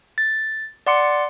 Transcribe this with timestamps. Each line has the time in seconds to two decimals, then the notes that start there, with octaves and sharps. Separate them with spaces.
0.18 A6
0.87 D5 F#5 C6 D6 C#7